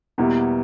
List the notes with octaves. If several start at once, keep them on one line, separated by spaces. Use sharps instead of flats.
E2 B2 G3 A#3 E4